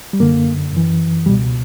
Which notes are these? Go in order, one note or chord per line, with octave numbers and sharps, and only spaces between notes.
G3
F#2 D3 A#3
F#2 E3
C#2 B2 G3